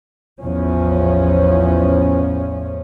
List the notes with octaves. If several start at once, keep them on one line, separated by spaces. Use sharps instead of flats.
A1 E2 F3 C#4